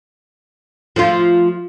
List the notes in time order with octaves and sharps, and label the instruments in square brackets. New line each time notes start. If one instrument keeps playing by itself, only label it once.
[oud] F3 A3 F4